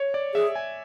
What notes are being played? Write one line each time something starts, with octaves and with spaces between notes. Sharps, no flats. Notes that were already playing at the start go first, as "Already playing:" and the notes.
Already playing: C#5
D5
G#4 E5
G#5